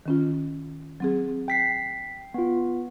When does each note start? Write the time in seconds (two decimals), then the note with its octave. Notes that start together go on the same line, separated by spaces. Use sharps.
0.06 D#3 C#4 F4
1.00 F#3 C4 G#4
1.48 G5 B6 C7
2.34 B3 F4